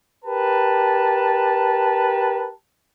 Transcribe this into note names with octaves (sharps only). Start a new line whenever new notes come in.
G4 A#4 B4 A5